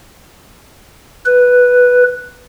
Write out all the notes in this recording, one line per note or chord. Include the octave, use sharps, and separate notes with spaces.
B4